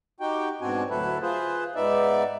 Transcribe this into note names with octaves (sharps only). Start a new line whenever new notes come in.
D#4 F#4 G4 G5
G#2 B2 C4 D4 F#4 G#5
D2 F#3 E4 A4 B4
F4 G#4 B4 C5
G#2 B3 D#4 D5 E5